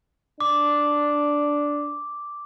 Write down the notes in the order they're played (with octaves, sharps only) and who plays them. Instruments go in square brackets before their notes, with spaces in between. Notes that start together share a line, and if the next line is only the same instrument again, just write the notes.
[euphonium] D4 [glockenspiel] D6